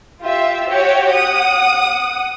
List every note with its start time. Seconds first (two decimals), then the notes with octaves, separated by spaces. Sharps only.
0.21 F4 G4 E5
0.68 F#4 G4 C#5 G5
1.11 F#5 D#6